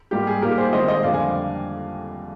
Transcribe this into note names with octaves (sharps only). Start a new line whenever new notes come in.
G#2 G3 A#3 F4 G4
G#4
A#2 G3 A#3 D#4 G4 A#4
G#4 C5
D#3 G#3 C4 F4 C5 D#5
C5 D#5
F2 D3 G3 A#3 D5 F5
F5 G#5